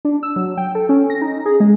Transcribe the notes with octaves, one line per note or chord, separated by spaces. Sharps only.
D4
E6
F#3
G5
A4
C#4
A#6
D#4
G#4
G#3